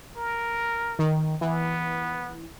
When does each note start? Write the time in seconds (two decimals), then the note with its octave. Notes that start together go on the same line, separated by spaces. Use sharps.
0.17 A#4
0.99 D#3
1.41 E3 B3